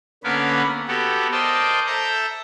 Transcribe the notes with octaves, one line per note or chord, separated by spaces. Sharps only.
D3 A#3 B3 C#4 A#4 B4
B3 F#4 G4 A4
A#4 C5 D5 D#5 G5 A5
A4 E5 A5 A#5 G6